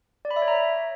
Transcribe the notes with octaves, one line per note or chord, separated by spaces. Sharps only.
D5
B5
E5
C#5
A#5